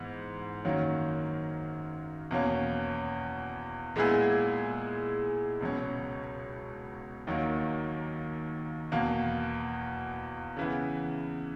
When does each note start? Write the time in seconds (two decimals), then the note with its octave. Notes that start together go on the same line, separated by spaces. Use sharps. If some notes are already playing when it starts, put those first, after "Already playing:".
Already playing: G#2 E3 B3
0.64 F#2 D#3 F#3 A#3 C#4
2.31 E2 B2 A#3 C#4
3.96 A#2 G#3 B3 E4 G#4
5.60 C#2 B2 F#3 C#4
7.27 D#2 D#3 F#3 A#3
8.92 E2 B2 A#3
10.57 C#3 E3 B3